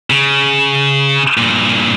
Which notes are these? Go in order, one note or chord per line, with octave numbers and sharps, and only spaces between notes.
C#3
G2 A#2